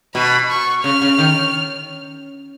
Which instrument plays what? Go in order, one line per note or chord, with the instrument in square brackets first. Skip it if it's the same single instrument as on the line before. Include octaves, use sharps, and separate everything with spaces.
[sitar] B2 [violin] B5
[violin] C#6
[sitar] C#3 [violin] F6
[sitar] C#3
D#3